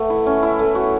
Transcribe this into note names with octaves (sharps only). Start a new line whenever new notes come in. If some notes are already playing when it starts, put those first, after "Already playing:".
Already playing: A3 B3
E4
C#4
E4
A3
F#4